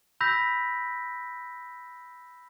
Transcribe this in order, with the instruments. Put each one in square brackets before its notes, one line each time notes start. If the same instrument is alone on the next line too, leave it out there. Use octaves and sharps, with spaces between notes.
[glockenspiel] B5 E6 G6 A#6 B6